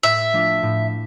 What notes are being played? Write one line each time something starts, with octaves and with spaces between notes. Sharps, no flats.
A2 E5
F3 A3 D4 F4
A2